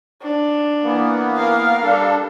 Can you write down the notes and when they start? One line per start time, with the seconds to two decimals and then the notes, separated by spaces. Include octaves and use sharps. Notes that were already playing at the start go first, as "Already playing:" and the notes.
0.22 D4
0.83 E3 A#3 B3
1.36 A#4 F5
1.83 G3 D4 A4